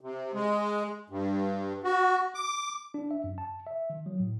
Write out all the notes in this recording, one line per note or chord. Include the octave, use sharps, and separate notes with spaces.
C3
G#3
G2
F#4
D6
D4
E5
F#2
A5
E5
D#3
F#3
A2